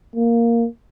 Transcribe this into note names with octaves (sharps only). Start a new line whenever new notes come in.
A#3